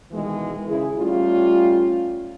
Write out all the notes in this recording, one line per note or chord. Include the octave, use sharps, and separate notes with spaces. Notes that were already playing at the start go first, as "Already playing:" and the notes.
B2 D#3 E3 G#3
C#3 E4 G#4
G3 A3 C#4 F4